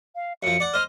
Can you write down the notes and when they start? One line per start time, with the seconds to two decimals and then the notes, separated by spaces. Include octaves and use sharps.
0.15 F5
0.43 F#2 F3 C#7
0.60 D5 F#5
0.74 C5 D#5 F6